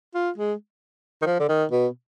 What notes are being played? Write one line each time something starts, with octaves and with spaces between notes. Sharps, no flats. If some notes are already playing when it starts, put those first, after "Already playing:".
F4
G#3
D#3
F3
D3
D#3
B2